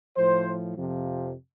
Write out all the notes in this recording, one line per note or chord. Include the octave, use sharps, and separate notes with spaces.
A2 F3 C5
F2 C3 F3